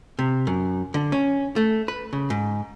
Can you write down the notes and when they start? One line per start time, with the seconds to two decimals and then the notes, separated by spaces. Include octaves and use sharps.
0.19 C3
0.47 F#2
0.94 D3
1.12 C#4
1.56 A3
1.88 B4
2.13 C#3
2.30 G#2